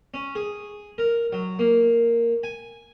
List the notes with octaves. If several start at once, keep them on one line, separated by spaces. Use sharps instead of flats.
C#4
G#4
A#4
F#3
A#3
G#5